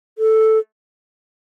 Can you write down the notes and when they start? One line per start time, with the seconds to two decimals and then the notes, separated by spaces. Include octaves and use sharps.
0.18 A4